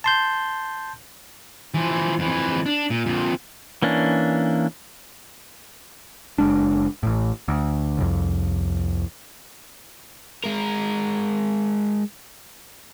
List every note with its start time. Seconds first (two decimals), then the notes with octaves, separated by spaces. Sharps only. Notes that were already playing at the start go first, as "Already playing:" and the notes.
0.04 A5 C6 G6
1.74 E3 F3
2.19 F2 E3
2.66 D4
2.90 A#2
3.06 F2 A#2
3.82 E3 A#3 C#4 D4
6.38 F#1 G#3 D4
7.03 A1 A2
7.48 D2
7.98 C2 F2
10.44 G#3 A#4